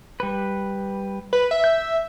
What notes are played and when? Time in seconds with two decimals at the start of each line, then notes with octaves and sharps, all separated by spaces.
0.20 G3 B4
1.33 B4
1.51 E5
1.64 G6